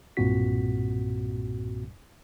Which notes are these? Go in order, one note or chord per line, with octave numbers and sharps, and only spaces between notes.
B1 G2 A#2 C4 F#4 B6